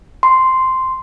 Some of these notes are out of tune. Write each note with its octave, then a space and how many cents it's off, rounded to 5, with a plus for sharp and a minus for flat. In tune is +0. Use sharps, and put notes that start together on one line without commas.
C6 -5